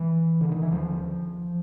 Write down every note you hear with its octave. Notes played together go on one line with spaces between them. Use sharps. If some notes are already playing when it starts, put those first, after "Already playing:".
Already playing: E3
D3
D#3
E3
D#2 D3 F3